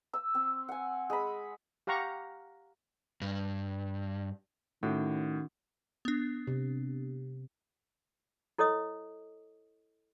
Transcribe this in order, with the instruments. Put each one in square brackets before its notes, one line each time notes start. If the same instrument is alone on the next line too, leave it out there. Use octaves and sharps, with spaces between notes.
[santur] E6
C4
F#5 G#5
G#3 B5
[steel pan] G4 F5 F#5 A#5 C#6
[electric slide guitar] G2
[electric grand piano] A2 [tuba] D#3 [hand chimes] C#4 F#4 F#5
[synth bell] B3 D4
[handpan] C3
[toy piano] E4 A4 C#5 D#5 D#6